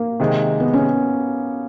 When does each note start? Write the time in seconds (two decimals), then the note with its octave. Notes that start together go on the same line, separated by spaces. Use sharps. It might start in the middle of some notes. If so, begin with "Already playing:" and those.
Already playing: A#3
0.20 C3 D#3 G#3
0.60 B3
0.73 C#4